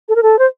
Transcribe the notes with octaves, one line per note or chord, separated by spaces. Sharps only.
A4
A#4
A4
C5